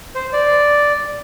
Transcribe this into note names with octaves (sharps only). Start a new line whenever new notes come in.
C5
D5